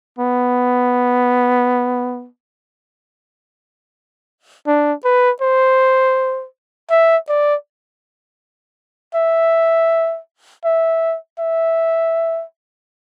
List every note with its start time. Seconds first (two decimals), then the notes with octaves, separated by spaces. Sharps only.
0.19 B3
4.67 D4
5.05 B4
5.42 C5
6.91 E5
7.29 D5
9.15 E5
10.65 E5
11.39 E5